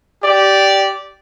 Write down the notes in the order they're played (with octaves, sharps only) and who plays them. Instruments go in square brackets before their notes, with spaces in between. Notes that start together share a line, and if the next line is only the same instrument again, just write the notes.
[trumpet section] G4 D5